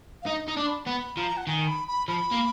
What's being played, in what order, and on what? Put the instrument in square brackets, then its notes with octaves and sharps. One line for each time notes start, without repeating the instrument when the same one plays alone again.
[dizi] F5
[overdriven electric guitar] D#4 [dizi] D#5
[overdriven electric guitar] D#4
[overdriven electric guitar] D4 [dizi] D6
[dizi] B5
[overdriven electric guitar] B3 [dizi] B5
[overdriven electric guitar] F3 [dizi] A#5
[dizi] F#5
[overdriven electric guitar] D#3 [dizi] G#5
[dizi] B5
B5
[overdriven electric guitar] F3 [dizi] B5
[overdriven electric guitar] A#3